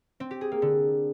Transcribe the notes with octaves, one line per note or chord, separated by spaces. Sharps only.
C4
G4
G#4
A#3
D3